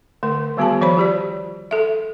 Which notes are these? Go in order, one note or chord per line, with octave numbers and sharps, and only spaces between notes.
D3 A3 A#4
D#3 G3 B3 F#4 G#4 A5
F3 C5 C#5 B5
F4 G4 D5
A4 E5